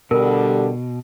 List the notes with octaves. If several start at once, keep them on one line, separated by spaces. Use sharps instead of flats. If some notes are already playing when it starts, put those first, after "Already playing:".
B2 D3 G3 A#4